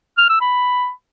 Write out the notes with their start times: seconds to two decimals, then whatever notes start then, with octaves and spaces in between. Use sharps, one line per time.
0.18 F6
0.29 E6
0.41 B5